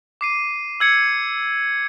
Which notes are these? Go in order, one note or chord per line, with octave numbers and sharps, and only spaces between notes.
D6 C7 D#7
E6 G#6 C#7